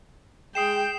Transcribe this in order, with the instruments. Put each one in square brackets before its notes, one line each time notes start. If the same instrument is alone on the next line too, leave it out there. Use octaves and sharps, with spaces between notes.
[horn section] G#3 [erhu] G5 [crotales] D#6 C7 E7